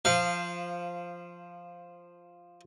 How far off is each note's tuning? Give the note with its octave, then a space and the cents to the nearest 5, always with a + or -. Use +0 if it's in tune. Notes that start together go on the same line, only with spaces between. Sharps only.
F3 +0 F5 -20